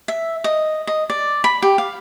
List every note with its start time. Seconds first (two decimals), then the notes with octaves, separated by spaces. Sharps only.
0.08 E5
0.44 D#5
0.87 D#5
1.10 D5
1.44 B5
1.62 G4
1.78 F5